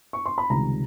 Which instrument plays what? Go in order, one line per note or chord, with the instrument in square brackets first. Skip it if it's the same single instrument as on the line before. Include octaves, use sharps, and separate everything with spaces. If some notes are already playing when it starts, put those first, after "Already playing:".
[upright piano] C#6
C6
B5
C#2 C3 D#3 G3 A#5